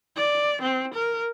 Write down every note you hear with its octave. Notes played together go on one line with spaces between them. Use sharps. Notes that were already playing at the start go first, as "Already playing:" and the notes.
D5
C4
A#4